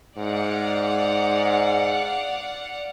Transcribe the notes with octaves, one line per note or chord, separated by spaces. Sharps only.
G#2 D5 F5 F#5